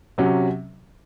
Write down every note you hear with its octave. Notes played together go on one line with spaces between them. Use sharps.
C3 F#3 C#4